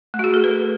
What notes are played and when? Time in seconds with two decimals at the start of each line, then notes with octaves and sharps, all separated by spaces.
0.14 A3
0.19 F#4
0.24 G#4
0.34 A4
0.44 B4